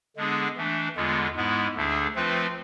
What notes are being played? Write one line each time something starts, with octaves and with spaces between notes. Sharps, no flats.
D3 G#3 B3 D4 G#4
E3 A3 D4
E2 D3 G#3 B3 F4
G#2 G#3 B3 E4
D2 D3 A3 D4 G#4
F3 A3 C4 F4 B4